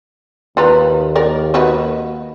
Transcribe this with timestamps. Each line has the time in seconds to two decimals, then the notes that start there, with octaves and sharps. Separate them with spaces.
0.57 D#2 F4 B4 A#5
1.16 A#4 D5
1.54 D#4 F#4 B4